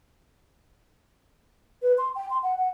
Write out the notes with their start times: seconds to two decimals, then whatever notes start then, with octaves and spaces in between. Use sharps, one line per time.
1.82 B4
1.98 C6
2.15 G5
2.30 C6
2.43 F#5
2.58 F#5